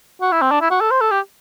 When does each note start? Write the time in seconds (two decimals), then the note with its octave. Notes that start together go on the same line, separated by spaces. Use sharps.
0.22 F#4
0.32 E4
0.42 C4
0.51 D4
0.61 E4
0.71 F#4
0.81 A4
0.91 C5
1.01 A4
1.11 G4